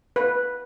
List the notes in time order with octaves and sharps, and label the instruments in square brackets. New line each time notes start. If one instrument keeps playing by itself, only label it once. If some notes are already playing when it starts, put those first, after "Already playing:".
[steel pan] B4